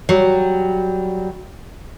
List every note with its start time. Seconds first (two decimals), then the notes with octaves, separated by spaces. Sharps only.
0.09 F#3 G3